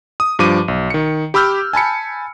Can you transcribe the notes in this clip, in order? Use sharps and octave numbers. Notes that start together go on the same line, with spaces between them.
D#6
G2 F3 D6 D#7
B1
D#3 C#7
G4 B5 D6 E6 F6 G6
G#5 A5 B5 C#7